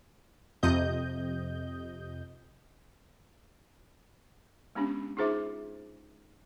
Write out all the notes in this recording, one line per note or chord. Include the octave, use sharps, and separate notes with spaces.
F2 C3 D#5 G6
G#3 B3 C#4 D4 G4
D#4 F4 G#4 C5 E5 D6